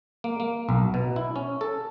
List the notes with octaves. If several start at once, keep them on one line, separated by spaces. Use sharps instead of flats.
A#3
A#3
B1
B2
E4
C#4
A4